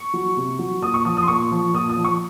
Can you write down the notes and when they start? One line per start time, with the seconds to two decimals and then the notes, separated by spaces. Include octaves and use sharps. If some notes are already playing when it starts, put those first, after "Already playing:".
Already playing: C#6
0.14 F#3
0.37 C3
0.59 F#3
0.82 A#2 D#6
0.94 C#6
1.05 F3 D#6
1.17 D#6
1.23 C6
1.28 A#2 C#6
1.52 F3
1.74 A#2 D#6
1.90 D#6
1.96 F3
2.05 C#6